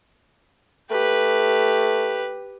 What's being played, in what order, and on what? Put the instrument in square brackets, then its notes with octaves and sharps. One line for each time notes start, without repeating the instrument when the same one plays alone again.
[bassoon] A3 [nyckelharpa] G4 B4